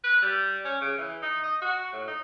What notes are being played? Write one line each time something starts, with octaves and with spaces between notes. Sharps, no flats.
B4
G3
C#4
C#3
E3
D#4
D#5
F#4
A2
D#4